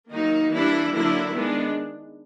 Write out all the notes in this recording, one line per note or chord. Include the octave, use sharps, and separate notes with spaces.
D#3 F#3 A#3 D#4
E3 G3 A#3 D4 E4
D3 F#3 A#3 D4 E4
D#3 G#3 B3 D4